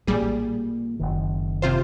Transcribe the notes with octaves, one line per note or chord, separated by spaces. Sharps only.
A1 A#2 G3 G#4
F#1 B1 D#3
C3 F4 C5